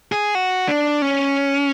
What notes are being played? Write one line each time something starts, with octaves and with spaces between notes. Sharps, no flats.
G#4
F#4
D4
C#4